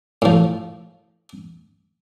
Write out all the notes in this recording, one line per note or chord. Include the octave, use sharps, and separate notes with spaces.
A2 F3